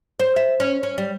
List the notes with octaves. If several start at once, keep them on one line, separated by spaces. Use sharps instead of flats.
C5
E5
C#4
C#4
G3